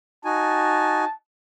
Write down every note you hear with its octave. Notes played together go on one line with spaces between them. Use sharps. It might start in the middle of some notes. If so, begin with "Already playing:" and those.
D#4 F#4 G#5 A5